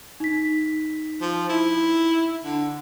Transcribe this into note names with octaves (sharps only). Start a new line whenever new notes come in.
D#4 B6
F3
E4
D3